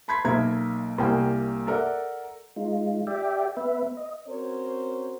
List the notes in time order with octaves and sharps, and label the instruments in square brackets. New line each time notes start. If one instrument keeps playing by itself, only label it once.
[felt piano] A5 B5 C6 G#6 B6
B1 A#3 E5 A#5 G#6
C2 G3 A#3 G5 G#5
A4 A#4 D5 E5 F#5
[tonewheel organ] G#3 D#4 F4
G4 D5 E5 G5
B3 B4 E5
D#5
[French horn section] C4 C#4 F#4 A#4 C5 C#5